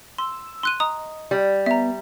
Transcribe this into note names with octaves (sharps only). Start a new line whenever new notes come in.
C6 E6
C6 F#6 D#7
D#5 A#5 D#6
G3
B3 E5 A#5